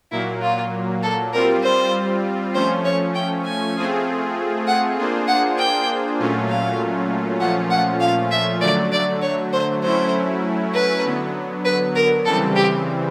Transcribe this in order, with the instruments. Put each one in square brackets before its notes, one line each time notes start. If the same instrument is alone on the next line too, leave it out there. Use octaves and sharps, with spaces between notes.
[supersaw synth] A#2 F#3 A#3 [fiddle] E4
[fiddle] F4
A4
[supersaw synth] G3 C4 F4 [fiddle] A#4
[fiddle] C5
[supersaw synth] F3 A3 C#4 [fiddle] C5
[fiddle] C#5
G5
G#5
[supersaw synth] A3 C4 F4 G#4
[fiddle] F#5
[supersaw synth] A#3 D4 F4 G#4 C5
[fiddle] F#5
G5
[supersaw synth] A#2 F#3 A3 C#4 F4
[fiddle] F5
[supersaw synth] A#2 F3 A3 C#4 F4 [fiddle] F#5
[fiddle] F#5
F5
E5
[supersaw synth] D3 F#3 A3 [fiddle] D5
[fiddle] D5
C#5
C5
[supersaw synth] F#3 A3 C#4 E4 [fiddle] C5
[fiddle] B4
[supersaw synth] D3 F#3 B3
[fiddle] B4
A#4
[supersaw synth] C#3 E3 G3 C4 [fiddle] A4
[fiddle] G4